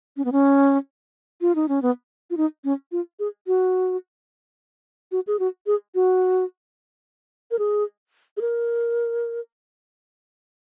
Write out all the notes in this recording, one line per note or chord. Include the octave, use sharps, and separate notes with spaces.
C#4
B3
C#4
F4
D#4
C#4
B3
F4
D#4
C#4
F4
G#4
F#4
F#4
G#4
F#4
G#4
F#4
A#4
G#4
G#4
A#4